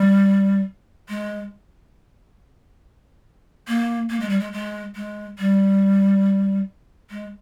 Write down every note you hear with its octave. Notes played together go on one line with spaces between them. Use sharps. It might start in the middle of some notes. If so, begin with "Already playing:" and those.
Already playing: G3
G#3
A#3
A#3
G#3
G3
G#3
G#3
G#3
G3
G#3